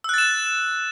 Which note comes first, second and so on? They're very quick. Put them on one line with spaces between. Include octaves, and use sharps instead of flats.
E6 F#6 A6 E7